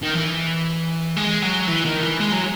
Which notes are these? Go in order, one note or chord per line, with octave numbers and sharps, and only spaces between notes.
D#3
E3
G#3
F#3
E3
D#3
E3
G#3
F#3